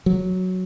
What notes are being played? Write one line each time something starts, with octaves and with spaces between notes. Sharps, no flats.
F#3